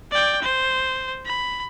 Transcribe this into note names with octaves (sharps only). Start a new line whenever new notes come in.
D5 G5
C5
B5